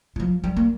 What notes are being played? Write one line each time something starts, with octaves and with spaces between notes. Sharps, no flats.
E3
F3
G3
A#3